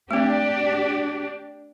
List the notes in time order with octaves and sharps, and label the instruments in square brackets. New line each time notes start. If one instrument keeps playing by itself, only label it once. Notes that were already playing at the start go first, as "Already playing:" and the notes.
[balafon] A3 C4 [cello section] D4 G4 D5